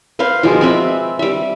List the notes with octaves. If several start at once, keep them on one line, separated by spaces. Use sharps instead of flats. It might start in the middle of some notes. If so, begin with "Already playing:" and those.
B4 C5 F5
B2 F3 G#3 A#3
C4 B4 E5
G3 E5